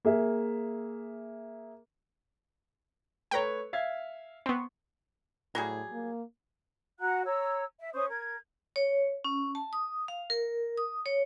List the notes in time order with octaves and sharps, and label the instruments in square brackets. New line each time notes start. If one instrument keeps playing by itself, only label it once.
[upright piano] A#3 G#4 E5
[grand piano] A3 B4 C#5 [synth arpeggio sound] G5 A#5
[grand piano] E5 F5 G#6
[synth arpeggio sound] B3 C4 [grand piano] C6 C#6
[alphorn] A2 [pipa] F#3 G3 G#4
[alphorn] A#3
[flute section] F#4 F#5 A#5 F#6
C#5 A#5 E6
E5
C#4 C5 C#6 D#6
A#4 G#6
[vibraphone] C#5
C#4
A5
D#6
F5
A#4
D#6
C#5